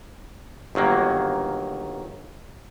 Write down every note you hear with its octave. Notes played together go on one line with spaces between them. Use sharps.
G1 D#3 F#3 A#3